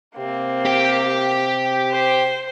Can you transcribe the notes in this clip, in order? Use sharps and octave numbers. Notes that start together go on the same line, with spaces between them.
C3 A#3 C4
G4 G5
C5